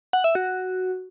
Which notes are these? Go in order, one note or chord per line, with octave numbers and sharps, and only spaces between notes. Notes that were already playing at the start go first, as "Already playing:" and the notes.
F#5
E5
F#4